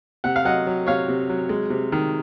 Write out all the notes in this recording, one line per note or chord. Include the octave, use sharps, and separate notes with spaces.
C3 F#5
F5
F#3 D#5 F#5
F#3
C3 C#5 F5
C3
F#3
G#3
C3
D#3